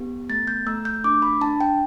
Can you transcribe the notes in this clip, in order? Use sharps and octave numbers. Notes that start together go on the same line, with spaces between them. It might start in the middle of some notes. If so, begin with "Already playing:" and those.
Already playing: B3 G4
A3 A6
G6
A3 E6
G6
D4 D6
B5
D4 A5
G5